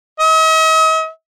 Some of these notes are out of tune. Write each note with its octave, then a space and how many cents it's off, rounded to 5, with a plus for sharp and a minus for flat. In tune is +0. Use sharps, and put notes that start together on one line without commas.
D#5 +45